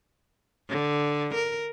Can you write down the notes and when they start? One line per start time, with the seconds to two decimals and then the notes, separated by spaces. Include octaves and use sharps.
0.70 D3
1.35 A#4